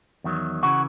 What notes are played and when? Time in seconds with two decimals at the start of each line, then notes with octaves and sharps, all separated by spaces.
0.24 E2 D#3 F#3
0.63 C#3 E3 F#4